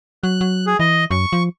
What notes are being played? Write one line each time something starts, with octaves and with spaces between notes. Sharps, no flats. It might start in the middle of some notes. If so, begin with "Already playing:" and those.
F#3 F#6
F#3
G#4
E3 D#5
F#2 C#6
F3